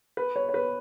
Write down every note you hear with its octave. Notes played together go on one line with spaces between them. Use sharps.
B4
C#5
C#5
B4